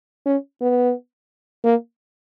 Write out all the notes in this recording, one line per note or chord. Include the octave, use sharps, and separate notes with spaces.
C#4
B3
A#3